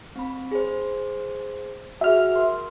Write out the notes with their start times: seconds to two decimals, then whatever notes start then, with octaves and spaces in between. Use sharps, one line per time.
0.16 C4 B5
0.51 G#4 C5
2.01 F#4 G#4 E5 F6
2.32 A#4 C6